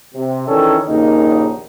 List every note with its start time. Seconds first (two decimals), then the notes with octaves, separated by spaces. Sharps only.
0.15 C3
0.48 D#3 E3 C#4 D4 G#4 A4
0.87 A#1 D#2 C#3 A#3 D#4